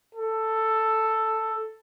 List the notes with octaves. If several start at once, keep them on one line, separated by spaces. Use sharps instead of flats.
A4